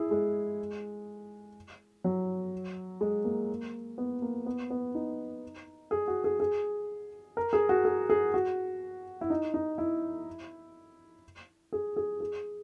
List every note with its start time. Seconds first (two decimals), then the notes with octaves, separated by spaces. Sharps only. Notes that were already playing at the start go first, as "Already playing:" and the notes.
Already playing: E4 G#4
0.11 G#3
2.04 F#3
3.01 G#3
3.25 A#3
3.98 B3
4.22 A#3
4.46 B3
4.70 B3
4.95 D#4
5.91 G#4
6.08 F#4
6.24 G#4
6.40 G#4
7.37 A#4
7.53 G#4
7.69 F#4
7.85 G#4
8.10 G#4
8.34 F#4
9.21 E4
9.30 D#4
9.54 D#4
9.78 E4
11.72 G#4
11.96 G#4
12.21 G#4